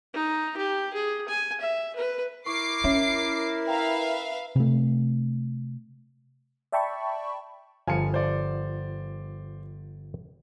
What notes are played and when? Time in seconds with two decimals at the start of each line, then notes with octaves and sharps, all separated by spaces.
0.14 D#4
0.57 G4
0.93 G#4
1.29 G#5
1.61 E5
1.96 B4
2.46 E4 A#4 C#6 D6 C7
2.84 C#4 C#5 E5
3.68 B4 E5 F5 G5 A#5
4.56 C3 A3
6.72 D5 E5 G5 A5 B5 C#6
7.87 G1 F3 F5 G#5 A5 C#7
8.14 C5 D5